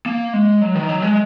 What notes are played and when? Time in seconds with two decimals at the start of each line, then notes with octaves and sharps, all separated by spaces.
0.06 A#3
0.33 G#3
0.61 F#3
0.75 D#3
0.89 F#3
1.02 G#3